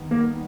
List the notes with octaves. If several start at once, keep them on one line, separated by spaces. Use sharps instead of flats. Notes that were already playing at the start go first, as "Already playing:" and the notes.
Already playing: D#3 G3 B3
A#3 A#4